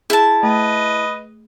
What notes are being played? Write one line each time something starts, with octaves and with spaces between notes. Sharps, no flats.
E4 G#4 A5
A3 B4 D#5